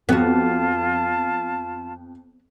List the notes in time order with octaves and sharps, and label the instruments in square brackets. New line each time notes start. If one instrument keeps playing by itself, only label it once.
[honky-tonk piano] F2 [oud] B3 F#4 [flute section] F4 A5